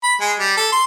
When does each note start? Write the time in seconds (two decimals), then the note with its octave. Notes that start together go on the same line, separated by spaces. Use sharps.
0.03 B5
0.21 G#3
0.39 G3
0.57 A4
0.72 C6